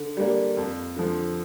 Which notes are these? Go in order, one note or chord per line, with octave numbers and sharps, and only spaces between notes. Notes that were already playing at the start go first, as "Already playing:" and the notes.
Already playing: D3
G3 A#3 D4
F2
D3 F3